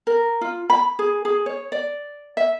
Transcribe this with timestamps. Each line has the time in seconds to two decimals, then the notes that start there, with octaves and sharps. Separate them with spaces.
0.07 A#4
0.41 F4
0.70 B5
0.99 G#4
1.25 G#4
1.46 C#5
1.72 D5
2.37 E5